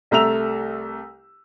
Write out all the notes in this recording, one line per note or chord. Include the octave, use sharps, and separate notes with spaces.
C2 A3 A#5 E6 F7